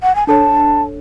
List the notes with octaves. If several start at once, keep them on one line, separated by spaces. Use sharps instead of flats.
F#5
G#5
D4 A4 C#5 A5